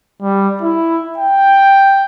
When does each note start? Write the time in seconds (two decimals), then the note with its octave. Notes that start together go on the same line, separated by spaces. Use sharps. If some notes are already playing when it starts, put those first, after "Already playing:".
0.22 G3
0.62 E4
1.18 G5